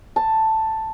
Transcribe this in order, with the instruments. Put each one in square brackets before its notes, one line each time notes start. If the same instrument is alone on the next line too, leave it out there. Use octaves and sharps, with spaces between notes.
[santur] A5